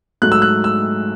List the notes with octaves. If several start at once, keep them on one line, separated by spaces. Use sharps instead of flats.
G#2 F#3 A3 F#6
E6
F#6
E6